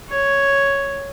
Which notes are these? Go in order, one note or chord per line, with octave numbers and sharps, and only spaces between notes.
C#5